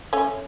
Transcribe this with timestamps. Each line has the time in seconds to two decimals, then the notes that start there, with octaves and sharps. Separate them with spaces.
0.13 A3 C#4